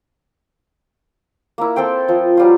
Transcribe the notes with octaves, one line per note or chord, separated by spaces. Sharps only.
A#3 E4
C4 A4 C5 G5
F3
F#3 G3 F4